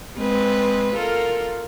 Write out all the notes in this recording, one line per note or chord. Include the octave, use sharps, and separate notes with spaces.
G#3 C4 B4
F4 A4 A#4